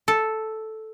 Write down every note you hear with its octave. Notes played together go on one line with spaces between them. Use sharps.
A4